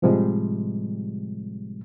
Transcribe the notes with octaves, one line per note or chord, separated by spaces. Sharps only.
A2 C3 F3 G3 G#3